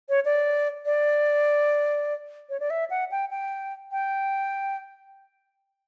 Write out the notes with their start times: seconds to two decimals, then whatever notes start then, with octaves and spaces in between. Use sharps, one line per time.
0.09 C#5
0.25 D5
0.86 D5
2.50 C#5
2.60 D5
2.70 E5
2.90 F#5
3.11 G5
3.30 G5
3.92 G5